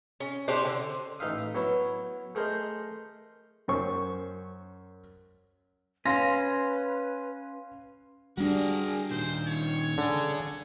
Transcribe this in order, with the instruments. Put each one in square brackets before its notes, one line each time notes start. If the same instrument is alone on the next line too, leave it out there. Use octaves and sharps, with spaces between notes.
[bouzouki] C#4
C#4 D4 G4 C5
D3
[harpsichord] A1 D#4 E5 F5 D#6
F#3 B3 E4 C#5
A3 G#4 A#4 C5 D#5
[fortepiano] F#2 C5 C#6
[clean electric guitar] C#4 [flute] B4 [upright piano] F5 C6 [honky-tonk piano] A#6
[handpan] G3 D4 [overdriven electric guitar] F#4 G#4 [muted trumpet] A#4
[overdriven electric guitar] A#2 D#3 [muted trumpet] C5
[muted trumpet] C#5
[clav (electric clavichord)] D3 [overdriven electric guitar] C#4 G#4